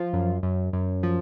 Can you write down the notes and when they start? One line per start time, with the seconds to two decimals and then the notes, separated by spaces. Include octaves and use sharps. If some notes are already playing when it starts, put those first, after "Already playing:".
Already playing: F3 F4
0.13 F#2
0.43 F#2
0.73 F#2
1.03 F3